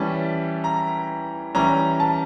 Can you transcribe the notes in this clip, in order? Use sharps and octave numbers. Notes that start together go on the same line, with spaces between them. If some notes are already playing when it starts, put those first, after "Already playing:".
Already playing: E3 G3 C#4 A5
A#5
E3 G3 C#4 A#5
A5